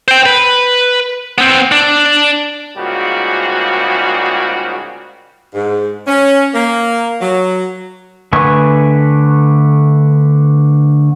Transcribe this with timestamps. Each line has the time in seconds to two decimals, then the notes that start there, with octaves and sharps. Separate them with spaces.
0.08 C5 G5
0.26 B4
1.38 B3 C4
1.72 D4
2.77 G#2 C#3 G3 A#3 F4 F#4
5.54 G#2
6.07 C#4
6.53 A#3
7.21 F#3
8.33 D3 A3 B4 G#5 C#6